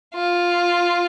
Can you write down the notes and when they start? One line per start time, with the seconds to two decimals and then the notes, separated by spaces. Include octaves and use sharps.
0.14 F4